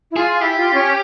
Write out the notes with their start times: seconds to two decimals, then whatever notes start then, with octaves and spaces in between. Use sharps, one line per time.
0.12 E4
0.16 F4 G#4
0.41 E4 G4
0.57 F4
0.73 C#4